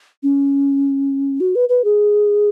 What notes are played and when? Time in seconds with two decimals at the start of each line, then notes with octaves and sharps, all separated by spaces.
0.23 C#4
1.40 F#4
1.55 B4
1.69 B4
1.84 G#4